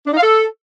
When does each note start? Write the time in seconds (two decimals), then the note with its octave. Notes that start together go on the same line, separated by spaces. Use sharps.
0.07 D4
0.12 D#4
0.17 F5
0.22 A4